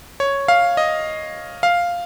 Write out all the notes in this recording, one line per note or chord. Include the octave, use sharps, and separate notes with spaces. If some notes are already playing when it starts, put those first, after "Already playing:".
C#5
F5
D#5
F5